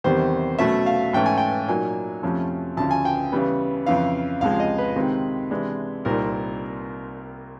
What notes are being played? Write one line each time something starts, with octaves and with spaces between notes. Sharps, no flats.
E2 C3 D#3 G3 C5
B2 F#3 A3 C#4 E5
F5
G#2 E3 A3 C#4 G5
G#5
G5
A#2 F#3 A#3 D#4 G#5
F2 C3 F3 A3 C#4
D2 C#3 F3 A5
G#5
G5
C#3 E3 G3 B3
F2 C#3 E3 F5
C#2 C3 F3 G#3 F5
D#5
B4
C3 D#3 G#3 C4 D#4
C3 E3 G#3 B3 D4
C2 A#2 G3 C4 D#4 A#4